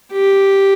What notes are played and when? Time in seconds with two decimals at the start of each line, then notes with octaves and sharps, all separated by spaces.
0.12 G4